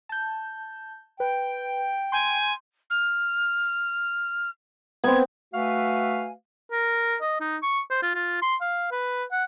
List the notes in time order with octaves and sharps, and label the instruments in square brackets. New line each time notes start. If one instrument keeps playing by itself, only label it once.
[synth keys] A5 G6
[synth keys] B4 [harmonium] G5
[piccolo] G#5 [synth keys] C6 G6
[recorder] F6
[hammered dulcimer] B3 C4 [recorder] G#6
[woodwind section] A3 F#4 B4 E5 F5 G#5
[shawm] A#4
D#5
D#4
C#6
C5
F4
F4
C6
F5
B4
F#5